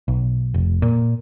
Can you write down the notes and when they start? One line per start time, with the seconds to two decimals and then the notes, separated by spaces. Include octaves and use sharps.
0.08 B1
0.54 F1
0.82 A#2